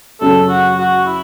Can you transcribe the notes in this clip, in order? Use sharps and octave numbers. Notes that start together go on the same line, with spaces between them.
F#2 C#3 F#3 C#4 A4
F#4
F#4
E4